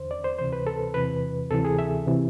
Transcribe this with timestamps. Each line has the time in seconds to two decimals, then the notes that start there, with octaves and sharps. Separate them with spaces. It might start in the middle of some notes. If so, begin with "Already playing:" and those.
Already playing: E2 D3 C5
0.11 D5
0.24 C5
0.38 D2 C3 E3 C5
0.53 B4
0.67 A4
0.94 E2 C3 E3 B4
1.50 D2 C3 E3 A4
1.65 G#4
1.79 E5
2.07 C3 E3